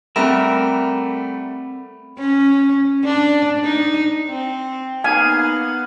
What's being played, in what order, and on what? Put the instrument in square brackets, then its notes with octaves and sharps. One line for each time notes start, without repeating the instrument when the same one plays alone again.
[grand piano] G3 A3 [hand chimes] C4 B5 [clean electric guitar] A#4 E5
[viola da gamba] C#4
D4
D#4
[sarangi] C4
[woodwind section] A#3 D#4 G#4 [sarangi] B3 [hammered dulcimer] F5 [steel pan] G#5